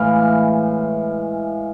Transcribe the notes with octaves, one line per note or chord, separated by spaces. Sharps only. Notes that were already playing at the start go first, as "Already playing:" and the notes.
Already playing: A2 E3 G#3 F5